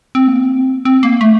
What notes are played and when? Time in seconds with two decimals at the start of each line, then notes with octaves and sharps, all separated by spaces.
0.15 C4
0.28 A#3
0.39 C4
0.85 C4
1.03 A#3
1.21 A3